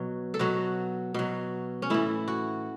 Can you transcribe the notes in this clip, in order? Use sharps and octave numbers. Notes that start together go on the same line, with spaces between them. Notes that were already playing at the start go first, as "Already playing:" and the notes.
Already playing: B2 F#3
A4
B2 F#3 F#4
B2 F#3
C#4
A2 E3 E4
F#4